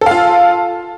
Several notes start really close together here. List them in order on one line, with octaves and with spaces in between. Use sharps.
A4 F5 F4